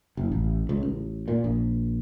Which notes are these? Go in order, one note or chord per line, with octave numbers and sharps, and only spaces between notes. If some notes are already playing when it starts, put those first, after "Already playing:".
F#1
A1
C#2
A1
A#2
A#1